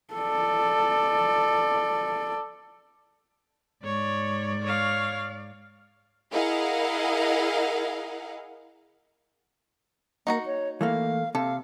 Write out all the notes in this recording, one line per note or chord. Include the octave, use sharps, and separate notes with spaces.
A4 D5
G#2 C#5 D5
C#5 F5
E4 G#4 A#4 D#5 F5 F#5
A#3 D#4 F#4 A#5
C#5
E3 A3 A#3 F5
C3 A4 F5